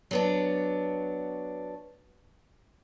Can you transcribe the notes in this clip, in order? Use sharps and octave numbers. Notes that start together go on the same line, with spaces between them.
F#3 B3 D4